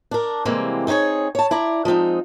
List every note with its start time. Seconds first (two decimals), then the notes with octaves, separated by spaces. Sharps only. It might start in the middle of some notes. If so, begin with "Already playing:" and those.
0.11 D4 A#4
0.45 C3 E3 G3 G#3 A#3 C4
0.87 C4 D#4 E4 G#4 C#5
1.35 C#5 A5
1.51 E4 D5 A#5
1.85 F3 G#3 C4 D#4